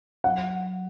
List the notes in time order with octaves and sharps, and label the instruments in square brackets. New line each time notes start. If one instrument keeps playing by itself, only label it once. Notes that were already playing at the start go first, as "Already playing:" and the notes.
[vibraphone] F#3 [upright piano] F#5